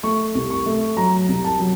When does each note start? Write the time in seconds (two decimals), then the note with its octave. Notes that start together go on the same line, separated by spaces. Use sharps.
0.03 A3 C#6
0.35 C2
0.50 C#6
0.66 A3
0.97 F#3 A#5
1.28 C2
1.44 A5
1.60 F#3